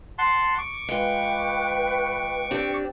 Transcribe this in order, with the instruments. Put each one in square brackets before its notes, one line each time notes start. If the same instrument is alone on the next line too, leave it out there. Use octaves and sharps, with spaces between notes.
[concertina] F#5 A5 C6
C#6 D6
[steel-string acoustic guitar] G#3 F4 [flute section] B4 G5
[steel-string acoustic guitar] C4 D4 G4